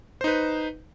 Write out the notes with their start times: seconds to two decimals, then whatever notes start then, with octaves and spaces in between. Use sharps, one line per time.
0.21 C5
0.24 D#4
0.27 B4